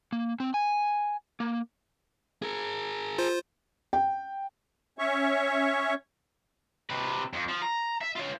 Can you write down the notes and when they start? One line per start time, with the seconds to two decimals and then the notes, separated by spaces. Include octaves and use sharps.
0.12 A#3
0.40 C4
0.54 G#5
1.40 A#3
2.42 G#4 A#4
3.18 F4 C5
3.93 G5
4.99 C#4 C#5 E5 C#6
6.90 C3 B4
7.33 F2
7.49 F3
7.62 A#5
8.01 E5
8.16 F4 C#5